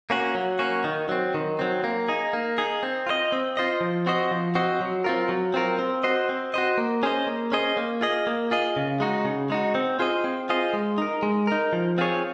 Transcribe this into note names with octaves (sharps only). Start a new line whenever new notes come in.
A#3 C#4 F#4
F#3
A#3 C#4 F#4
D#3
F#3 C4
D#3
F#3 C4
A#3
D#4 G#4
A#3
D#4 G#4
C4
F4 C5 D#5
C4
F4 C5 D#5
F3
C4 F#4 C5 D#5
F3
C4 F#4 C5 D#5
F#3
C4 F4 A#4
F#3
C4 F4 A#4
C4
F#4 C5 D#5
C4
F#4 C5 D#5
A#3
C#4 G#4 C5 D#5
A#3
C#4 G#4 C5 D#5
A#3
F4 G#4 D#5
A#3
F4 G#4 D#5
C#3
G#3 D#4 F#4
C#3
G#3 D#4 F#4
C4
F4 G#4 C5 D#5
C4
F4 G#4 C5 D#5
G#3
D#4 A#4
G#3
D#4 A#4
F3
C4 F4 G#4 C#5